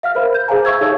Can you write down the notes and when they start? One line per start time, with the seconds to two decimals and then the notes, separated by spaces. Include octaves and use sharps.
0.03 E5 F5 F6
0.15 A#4 C5 B5
0.34 G6
0.48 G#4 C5 F5 G#5 A#5
0.65 E5 F5 C#6 E6 G#6
0.81 D#4 G4 A4 C#5 E5 F5